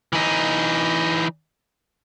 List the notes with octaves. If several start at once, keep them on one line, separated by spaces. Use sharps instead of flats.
E3 D#4